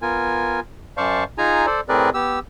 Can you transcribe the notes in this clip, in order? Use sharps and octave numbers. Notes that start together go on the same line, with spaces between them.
B3 F4 A#4 G#5
F#2 C5 D5 F5 A5 C#6
D#4 F4 G#4 G#5 A#5
A4 C5 D5
A2 C4 G#4 A#4 B4 D5
B3 G4 E6